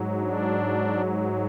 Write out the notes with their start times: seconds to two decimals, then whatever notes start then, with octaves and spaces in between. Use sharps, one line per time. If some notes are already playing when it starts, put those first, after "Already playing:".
Already playing: G#2 F#3
0.20 D4